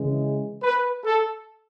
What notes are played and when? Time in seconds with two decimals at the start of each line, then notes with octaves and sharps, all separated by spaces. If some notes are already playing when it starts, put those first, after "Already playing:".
Already playing: C#3 E3 G#3
0.63 B4
1.03 A4